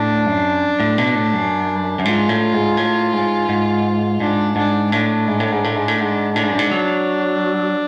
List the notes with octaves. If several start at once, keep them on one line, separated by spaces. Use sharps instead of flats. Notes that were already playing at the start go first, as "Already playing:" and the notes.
Already playing: A2 D4
F#2
A2
B2
A2
F#2
F#2
G#2 F4
A2
G#2
A2
G#2
G#2
G#2 D4
G#2 D4
A2 D4
G#2
A2
G#2
A2
G#2
A2
G#2
A2 D4
G#2
F#2
G#2
F#3